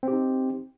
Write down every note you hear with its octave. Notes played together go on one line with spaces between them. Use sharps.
C4 D#4 G4